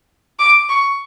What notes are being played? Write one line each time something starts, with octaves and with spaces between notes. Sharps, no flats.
D6
C#6